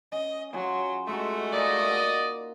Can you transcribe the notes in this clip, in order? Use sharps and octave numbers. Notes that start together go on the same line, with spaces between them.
C#4 D#5
F#3 F4 G#4
G#3 A3 D#4 F#4 C6
A#3 D5 D#5